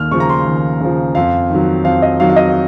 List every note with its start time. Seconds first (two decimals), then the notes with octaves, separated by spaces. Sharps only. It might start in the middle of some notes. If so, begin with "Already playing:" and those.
Already playing: D#2 F6
0.11 C#3 F3 C#6
0.20 A#5
0.29 C6
0.46 D#2
0.80 C#3 F3
1.15 F2 F5
1.50 D#3 F#3
1.84 F2 F5
2.02 D#5
2.19 D#3 F#3 F5
2.30 F5
2.36 D#5